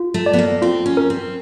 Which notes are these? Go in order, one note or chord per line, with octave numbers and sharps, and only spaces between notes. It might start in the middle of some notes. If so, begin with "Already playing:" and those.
Already playing: F4
A3
D5
B3
A#3
C4 F4
C#4
A#4
C4